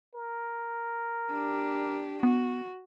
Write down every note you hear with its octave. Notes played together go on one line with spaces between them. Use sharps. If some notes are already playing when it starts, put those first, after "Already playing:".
A#4
D4 G4
B3 F#4